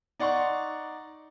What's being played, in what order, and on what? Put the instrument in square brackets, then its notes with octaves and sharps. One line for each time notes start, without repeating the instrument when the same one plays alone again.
[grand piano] D#4 D5 F#5 C6 C#6